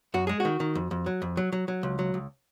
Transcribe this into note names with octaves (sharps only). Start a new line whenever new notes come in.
F#2 F#4
G#3 G#4
D#3 F#4
D#3
F2
F2
F#3
F2
F#3
F#3
F#3
C#2
F#3
C#2